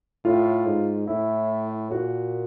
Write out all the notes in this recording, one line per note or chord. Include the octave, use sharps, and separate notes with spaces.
A2 F4
G#2
A2 E4
A#2 F#4